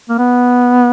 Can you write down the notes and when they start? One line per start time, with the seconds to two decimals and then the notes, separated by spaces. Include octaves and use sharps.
0.09 A#3
0.18 B3